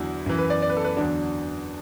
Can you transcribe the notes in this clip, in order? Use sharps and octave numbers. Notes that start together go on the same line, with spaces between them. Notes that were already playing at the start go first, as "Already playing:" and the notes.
Already playing: E2 D3 F#3 E4
F#2 E3
B4
D5
D5
B4
A4
B4
E2 D3 F#3 D4